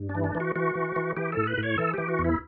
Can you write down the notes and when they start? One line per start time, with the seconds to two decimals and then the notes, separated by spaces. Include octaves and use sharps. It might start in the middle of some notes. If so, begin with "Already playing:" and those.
Already playing: G2
0.09 D4
0.15 E3
0.24 D4
0.35 E3
0.40 F#4
0.56 E3 F#4
0.75 E3
0.96 E3
1.17 E3 G4
1.32 A2 A4
1.47 B4
1.58 A2
1.63 C#5
1.78 E3 A4
1.94 E3 G4
2.08 F#4
2.19 E2
2.24 E4